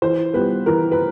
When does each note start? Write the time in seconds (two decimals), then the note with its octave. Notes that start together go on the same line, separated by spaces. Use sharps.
0.02 E3 C5
0.34 G3 B3 B4
0.66 E3 A#4
0.92 B4